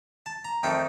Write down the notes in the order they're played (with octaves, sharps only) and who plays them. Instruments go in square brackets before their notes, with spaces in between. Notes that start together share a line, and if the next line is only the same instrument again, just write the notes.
[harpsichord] A5
A#5
F2 D#3 A3 G5